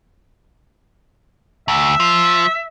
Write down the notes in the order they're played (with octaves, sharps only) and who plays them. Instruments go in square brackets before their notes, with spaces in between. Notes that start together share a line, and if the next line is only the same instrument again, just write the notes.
[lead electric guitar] D2 [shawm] E5
[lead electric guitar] F3